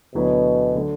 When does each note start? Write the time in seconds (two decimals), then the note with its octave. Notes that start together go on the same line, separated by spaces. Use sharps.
0.15 D2 B2 D3 F#3 B3 E4
0.75 D3 F#3 A3 D4